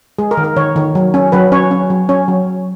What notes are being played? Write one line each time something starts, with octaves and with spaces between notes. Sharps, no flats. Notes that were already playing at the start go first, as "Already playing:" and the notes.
G#3 G#4
A#4
D#3
A#4
D#3 C#5
D#3
F#3
C#4
F#3 B4
C#4 C#5
C#4
F#3
C#4 C#5
F#3